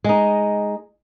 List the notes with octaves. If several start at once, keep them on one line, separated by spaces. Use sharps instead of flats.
G#3 D#4